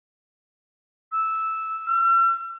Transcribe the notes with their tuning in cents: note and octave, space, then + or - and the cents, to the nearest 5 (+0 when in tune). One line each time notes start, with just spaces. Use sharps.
E6 -10
E6 +45